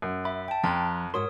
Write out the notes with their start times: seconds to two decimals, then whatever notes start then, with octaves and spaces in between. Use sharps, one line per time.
0.02 F#2
0.25 E5 B5
0.48 G5 A5
0.64 F2 F3 A#5 C6 F#6
1.14 G#2 F#4 A#4 C#5 C6 D#6